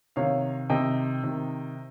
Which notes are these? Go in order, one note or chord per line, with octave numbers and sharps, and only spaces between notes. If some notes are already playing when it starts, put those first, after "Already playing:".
C3 D#3 C#5 F5
C3 D#3 D#5 G5
C3 D#3